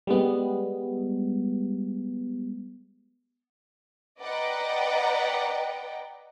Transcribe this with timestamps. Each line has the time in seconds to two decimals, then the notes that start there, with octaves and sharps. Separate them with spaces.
0.07 G3 G#3 B3
4.21 B4 D5 D#5 F#5 G5 A#5